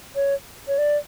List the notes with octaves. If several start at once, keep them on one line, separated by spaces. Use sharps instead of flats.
C#5
C#5
D5